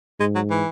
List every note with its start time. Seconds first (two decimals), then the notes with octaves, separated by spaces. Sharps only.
0.20 G#2 G#3
0.35 F#3
0.51 E3